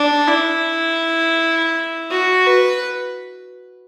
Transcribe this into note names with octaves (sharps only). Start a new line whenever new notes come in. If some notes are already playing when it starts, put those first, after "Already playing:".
Already playing: D4
E4
F#4
B4